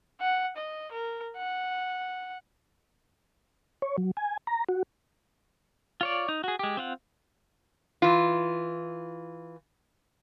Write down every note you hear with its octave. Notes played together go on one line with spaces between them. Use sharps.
F#5
D#5
A#4
F#5
C#5
F#3
G#5
A#5
F#4
F4 C#5 D5
D#4
F#4 G#4
G#3 G4
C4 F4 F#5
E3 F4